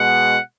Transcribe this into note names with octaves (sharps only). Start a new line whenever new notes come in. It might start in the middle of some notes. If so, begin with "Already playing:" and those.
Already playing: B2 G#3 F#5